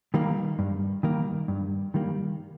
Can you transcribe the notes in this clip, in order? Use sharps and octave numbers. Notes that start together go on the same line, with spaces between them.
D#3 G3 A#3
G2
D#3 G3 A#3
G2
D#3 G3 A#3